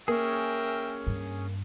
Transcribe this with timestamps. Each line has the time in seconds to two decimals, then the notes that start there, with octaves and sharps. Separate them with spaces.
0.08 A#3 C#4 G#4 A#4 E5 G5
1.07 G2